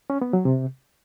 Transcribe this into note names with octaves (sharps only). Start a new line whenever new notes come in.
C#4
B3
F#3
C3